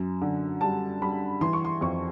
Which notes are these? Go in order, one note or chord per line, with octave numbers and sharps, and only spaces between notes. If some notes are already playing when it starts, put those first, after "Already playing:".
Already playing: F#2
D3
G3 A5
G3 B5
E3 C6
C#6
C6
F2 C#6